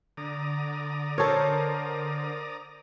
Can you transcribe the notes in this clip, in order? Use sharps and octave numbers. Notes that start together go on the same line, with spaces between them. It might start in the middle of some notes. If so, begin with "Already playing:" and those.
D3 D5 A#5 D#6
A4 A#4 C5 C#5